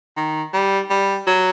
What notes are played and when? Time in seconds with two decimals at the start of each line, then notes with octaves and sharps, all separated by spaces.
0.17 D#3
0.53 G3
0.90 G3
1.27 F#3